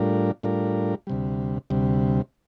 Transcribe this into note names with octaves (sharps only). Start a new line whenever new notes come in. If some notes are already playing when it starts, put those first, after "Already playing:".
Already playing: A2 G3 D4 F4 A#4
A2 G3 D4 F4 A#4
D2 C3 G3
D2 C3 G3